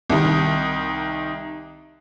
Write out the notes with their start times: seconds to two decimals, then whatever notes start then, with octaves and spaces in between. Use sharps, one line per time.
0.10 C2 D#3